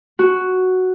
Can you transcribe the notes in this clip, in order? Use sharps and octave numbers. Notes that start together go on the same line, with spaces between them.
F#4